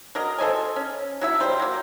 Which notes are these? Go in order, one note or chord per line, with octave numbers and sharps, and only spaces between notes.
F#3 A#4 D#5
A4 C5 D#5 G#5
C#4
F#3 E4 E5
G3 C5
F#3 A#3